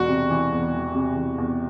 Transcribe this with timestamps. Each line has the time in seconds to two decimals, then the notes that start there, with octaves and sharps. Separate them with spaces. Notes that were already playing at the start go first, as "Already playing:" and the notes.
Already playing: E1 F#4
0.09 C3
0.30 E3
0.52 E2
0.73 E1
0.95 C3
1.16 E3
1.38 E2